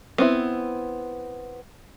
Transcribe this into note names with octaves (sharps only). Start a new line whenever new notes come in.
B3 C4 E4